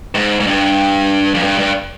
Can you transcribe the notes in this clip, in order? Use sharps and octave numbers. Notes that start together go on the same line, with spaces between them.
G#2
G#2
G2
F2
G2
G2